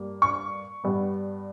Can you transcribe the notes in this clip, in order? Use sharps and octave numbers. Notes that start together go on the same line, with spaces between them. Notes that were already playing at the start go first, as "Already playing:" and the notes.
Already playing: G2 G3 A#3
C#6
G2 G3 B3